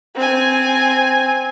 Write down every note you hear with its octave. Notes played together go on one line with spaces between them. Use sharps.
C4 G#5